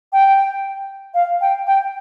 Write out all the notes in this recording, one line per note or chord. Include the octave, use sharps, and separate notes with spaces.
G5
F5
G5
G5